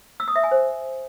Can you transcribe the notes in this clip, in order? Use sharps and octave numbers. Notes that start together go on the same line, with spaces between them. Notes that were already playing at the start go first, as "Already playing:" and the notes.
E6
D#6
E5
G#5
C5